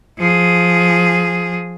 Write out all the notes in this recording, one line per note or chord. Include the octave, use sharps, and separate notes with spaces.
F3 G#4